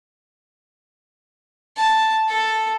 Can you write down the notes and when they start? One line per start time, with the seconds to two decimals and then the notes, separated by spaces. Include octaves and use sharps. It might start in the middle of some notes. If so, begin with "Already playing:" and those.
1.76 A5
2.27 A4